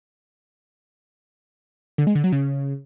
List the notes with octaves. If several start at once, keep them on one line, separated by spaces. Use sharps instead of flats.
D3
G#3
D3
F#3
C#3